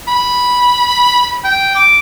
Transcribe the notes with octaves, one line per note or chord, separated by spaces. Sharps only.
B5
G5
D6